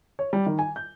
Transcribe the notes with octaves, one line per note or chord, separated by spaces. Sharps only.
C#5
G3
D#3
G#5
G6